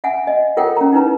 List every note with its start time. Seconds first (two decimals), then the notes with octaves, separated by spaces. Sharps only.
0.04 E5 F#5 G#5
0.27 D#5
0.57 F4 A4 A#4 C#5 F#5 G5
0.77 C#4 A#5
0.93 D#4 E4 B4 A#5